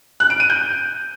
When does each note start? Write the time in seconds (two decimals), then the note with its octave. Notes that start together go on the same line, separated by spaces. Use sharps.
0.20 F#6
0.30 D7
0.40 D#7
0.50 G6